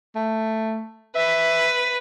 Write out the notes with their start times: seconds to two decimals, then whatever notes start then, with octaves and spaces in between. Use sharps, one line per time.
0.15 A3
1.16 B4 E5